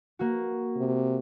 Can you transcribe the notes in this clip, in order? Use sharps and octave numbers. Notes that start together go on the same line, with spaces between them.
A#3 F#4
C3